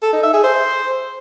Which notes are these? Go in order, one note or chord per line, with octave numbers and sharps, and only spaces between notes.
A4
D#4
E5
G#4
C5